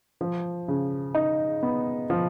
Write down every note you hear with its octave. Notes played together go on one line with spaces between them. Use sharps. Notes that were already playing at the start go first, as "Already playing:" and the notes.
F3
C#3
D#4
B3
F3